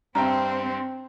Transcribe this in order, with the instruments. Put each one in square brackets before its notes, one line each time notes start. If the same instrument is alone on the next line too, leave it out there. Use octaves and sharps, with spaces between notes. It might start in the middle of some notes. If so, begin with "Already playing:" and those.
[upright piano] G2 E5 G5 [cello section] C4 [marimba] A#5